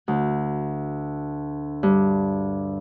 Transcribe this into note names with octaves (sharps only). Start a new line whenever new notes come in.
D2
G2